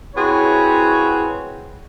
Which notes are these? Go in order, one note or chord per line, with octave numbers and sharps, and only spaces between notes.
C4 E4 F#4 G#4 B4 C#5